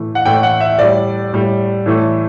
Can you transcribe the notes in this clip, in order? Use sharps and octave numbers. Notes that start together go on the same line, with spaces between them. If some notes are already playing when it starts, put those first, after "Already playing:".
Already playing: A2 E3 A3
F#5
A2 E3 A3 G5
F#5
E5
A2 G3 D5
A2 G3
A2 E3 A3